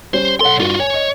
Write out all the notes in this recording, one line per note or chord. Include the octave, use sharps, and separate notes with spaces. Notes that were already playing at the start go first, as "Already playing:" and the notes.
G3 C#4 C5 C#5
B1 A4 C#5 F#5 C6
G2 F4 F#4
C#5 G#5
D#5